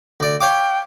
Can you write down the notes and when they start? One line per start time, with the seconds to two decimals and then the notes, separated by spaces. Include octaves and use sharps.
0.20 D2 D5
0.41 C#5 F5 G5 D6